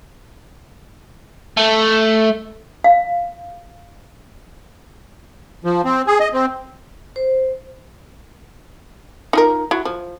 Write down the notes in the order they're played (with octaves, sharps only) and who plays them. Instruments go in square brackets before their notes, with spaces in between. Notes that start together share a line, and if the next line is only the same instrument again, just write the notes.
[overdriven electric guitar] A3
[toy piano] F5
[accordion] F3
C4
G#4
D#5
C4
[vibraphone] C5
[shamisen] D#4 F4 A#4
E4 F#4
F3